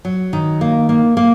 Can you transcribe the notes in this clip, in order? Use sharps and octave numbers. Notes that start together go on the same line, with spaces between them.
F#3
D#3
A#3
A#3
A#3